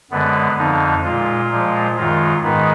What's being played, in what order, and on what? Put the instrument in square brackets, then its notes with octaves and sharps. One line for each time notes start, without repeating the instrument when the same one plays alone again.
[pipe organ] F#2 D3 G#3 B3
F2 D3 F3 D#4
A#2 G#3 F4
A#2 F3 G#3
F#2 D#3 G#3 F4
G#2 D#3 G#3 B3